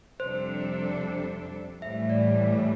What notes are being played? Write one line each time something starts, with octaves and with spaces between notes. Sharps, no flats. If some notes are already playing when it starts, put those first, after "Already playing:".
F2 C3 G3 D4 A4 C5
A2 E3 G3 E5
D5